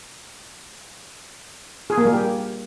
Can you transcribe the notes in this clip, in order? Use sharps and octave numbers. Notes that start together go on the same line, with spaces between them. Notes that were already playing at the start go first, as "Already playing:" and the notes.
G#4
A#3
G3
G4